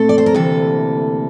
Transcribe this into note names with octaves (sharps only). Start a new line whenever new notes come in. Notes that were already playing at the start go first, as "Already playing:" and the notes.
Already playing: A#2 A3 C4 A4
D5
C5
A#4
D2 C3 E3 A#3 A4